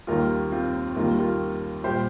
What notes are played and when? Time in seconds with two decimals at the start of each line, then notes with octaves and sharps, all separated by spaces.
0.07 D#2 D#3 G3 F4 A#4
0.52 C4 F4
0.96 D#2 D#3 G3 F4 A#4
1.19 F4 A#4
1.84 A#2 G3 G4 C5